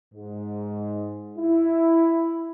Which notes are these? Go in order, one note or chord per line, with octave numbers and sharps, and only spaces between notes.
G#2
E4